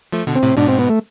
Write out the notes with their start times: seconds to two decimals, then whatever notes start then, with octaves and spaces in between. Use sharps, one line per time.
0.12 F3 A3
0.27 B2 D3
0.35 C4
0.43 A2 C3
0.57 G#2 B2 D4
0.68 C4
0.79 B3
0.89 A3